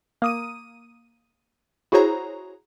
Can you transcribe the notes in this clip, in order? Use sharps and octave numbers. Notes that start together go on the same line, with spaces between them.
A#3 D#6 D#7
E4 F#4 G#4 C5 C#5 A#5